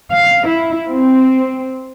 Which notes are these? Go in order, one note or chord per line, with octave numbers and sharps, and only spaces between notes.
F5
E4
C4